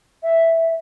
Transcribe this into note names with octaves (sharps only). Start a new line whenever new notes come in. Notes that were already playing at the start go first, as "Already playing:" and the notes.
E5